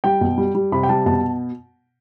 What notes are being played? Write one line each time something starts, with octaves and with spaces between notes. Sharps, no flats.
G3 G5
B2
G3
G3
C3 B5
G5
G3 A5
B2 A5